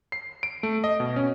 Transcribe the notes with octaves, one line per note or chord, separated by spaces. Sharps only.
C7
D7
A3
D#5
B2
C#4